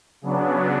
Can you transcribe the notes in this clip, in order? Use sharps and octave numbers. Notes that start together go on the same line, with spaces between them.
C#3 F#3 B3 D4